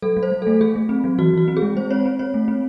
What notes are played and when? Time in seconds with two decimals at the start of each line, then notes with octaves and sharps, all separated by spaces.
0.02 F#3 A4
0.17 F#3
0.23 C5
0.32 F#3
0.42 A3 A4
0.61 F#3 G#4
0.76 A3
0.89 C4
1.04 F#3
1.18 E3 F#4
1.33 E3 F#4
1.48 C4
1.57 G#4
1.62 G#3
1.76 G#3 C5
1.90 C4 C#5
2.06 C4
2.19 C4 C#5
2.34 A3
2.48 C4